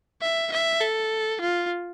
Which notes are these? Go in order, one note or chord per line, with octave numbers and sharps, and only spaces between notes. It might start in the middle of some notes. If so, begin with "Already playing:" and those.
E5
E5
A4
F4